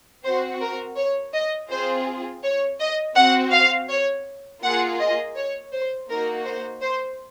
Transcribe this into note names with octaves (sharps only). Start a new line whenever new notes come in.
C4 F#4 C5
A#4
C#5
D#5
C4 F4 G#4 C5
C#5
D#5
C4 F#4 F#5
F5
C#5
A#3 F4 G#4 F#5
D#5
C#5
C5
A#3 D#4 F#4 A#4
C5
C5